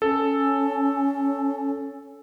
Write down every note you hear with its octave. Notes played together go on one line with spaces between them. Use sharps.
C#4 A4